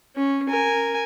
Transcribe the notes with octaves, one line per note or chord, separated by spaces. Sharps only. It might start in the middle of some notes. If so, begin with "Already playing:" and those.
C#4
A#4 G#5